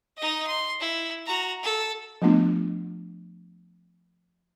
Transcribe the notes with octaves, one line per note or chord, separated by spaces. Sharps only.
D#4 D#5
C6
E4
F#4 A#5
A4
F3 A3 B3 D4 F4